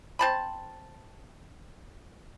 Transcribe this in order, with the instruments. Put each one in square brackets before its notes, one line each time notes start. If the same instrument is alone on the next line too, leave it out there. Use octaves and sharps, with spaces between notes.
[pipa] C4 A5 B5